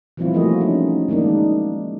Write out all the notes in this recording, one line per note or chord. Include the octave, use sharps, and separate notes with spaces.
E3 F3 G3 C4 E4 F4
A3 A#3 F#4 G#4 D#5
C#4 D#4
D#3 G#3 A#3 D4 D#4